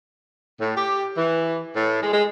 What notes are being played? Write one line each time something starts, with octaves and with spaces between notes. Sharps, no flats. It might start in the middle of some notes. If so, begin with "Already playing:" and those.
A2
G4
E3
A2
G#3
G#3